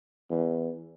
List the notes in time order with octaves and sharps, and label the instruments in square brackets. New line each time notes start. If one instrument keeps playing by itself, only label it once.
[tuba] E2